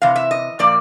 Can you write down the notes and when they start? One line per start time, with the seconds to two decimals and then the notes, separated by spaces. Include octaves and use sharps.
0.02 C3 E3 F5
0.16 E5
0.31 D#5
0.59 A#2 F3 A#3 D5